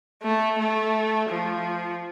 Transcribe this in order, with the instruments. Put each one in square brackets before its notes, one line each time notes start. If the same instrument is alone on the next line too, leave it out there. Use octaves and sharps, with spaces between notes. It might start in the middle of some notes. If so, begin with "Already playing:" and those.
[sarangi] A3
A3
F3